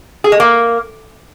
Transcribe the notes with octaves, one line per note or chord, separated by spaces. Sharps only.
G#4
G#3
A#3